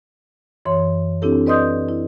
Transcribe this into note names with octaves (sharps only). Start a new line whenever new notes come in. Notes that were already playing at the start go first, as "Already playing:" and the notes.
F#2 E3 C#5 C6
C4 D4 E4 G4 A4
B4 D5 D#5 C6 D#6 G6
E4